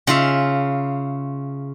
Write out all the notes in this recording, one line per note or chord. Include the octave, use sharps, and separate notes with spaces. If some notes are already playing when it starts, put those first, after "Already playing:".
C#3 F4 E5